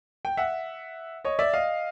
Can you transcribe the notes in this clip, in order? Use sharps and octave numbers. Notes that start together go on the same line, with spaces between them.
G5
E5 F#5
C#5 D#5
D5 E5
D#5 F5